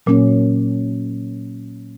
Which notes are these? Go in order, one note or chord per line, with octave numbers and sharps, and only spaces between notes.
A#2 F#3 A#3 C#4